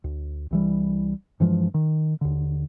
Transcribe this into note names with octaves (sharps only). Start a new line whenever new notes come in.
D2
C2 E3 G3
G2 E3 F3 G#3
D#3
D#2 D3